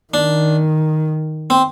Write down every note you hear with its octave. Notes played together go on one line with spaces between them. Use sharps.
D#3 D4
C4